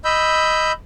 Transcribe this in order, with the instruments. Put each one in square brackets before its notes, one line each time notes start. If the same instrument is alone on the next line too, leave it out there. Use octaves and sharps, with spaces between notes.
[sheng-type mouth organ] D#5 B5 E6 G6